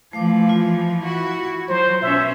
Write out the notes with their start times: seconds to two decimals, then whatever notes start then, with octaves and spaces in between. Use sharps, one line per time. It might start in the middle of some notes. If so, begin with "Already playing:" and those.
0.13 E3 F3 A3 F5 D6
0.49 F4
1.02 E4 F#4
1.69 F#3 C5
2.02 B2 C#4 E5